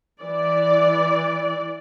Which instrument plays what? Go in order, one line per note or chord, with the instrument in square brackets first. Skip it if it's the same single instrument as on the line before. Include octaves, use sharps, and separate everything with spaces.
[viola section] E3 D5